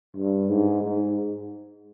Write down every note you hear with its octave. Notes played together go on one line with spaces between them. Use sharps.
G2
G#2
G#2